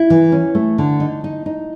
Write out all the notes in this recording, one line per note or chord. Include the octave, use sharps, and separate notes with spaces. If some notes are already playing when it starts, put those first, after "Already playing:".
Already playing: E4
E3
C#4
A3
D3
D#4
D#4
D#4